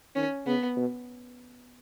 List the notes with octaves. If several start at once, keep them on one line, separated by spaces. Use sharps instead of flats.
D#3 C#4
C#3 B3
B2